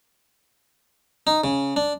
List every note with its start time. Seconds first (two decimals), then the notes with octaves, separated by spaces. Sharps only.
1.27 D#4
1.44 C#3
1.76 D4